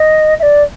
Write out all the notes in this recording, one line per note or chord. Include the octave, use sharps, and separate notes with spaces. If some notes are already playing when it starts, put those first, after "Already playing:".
Already playing: D#5
E5
D5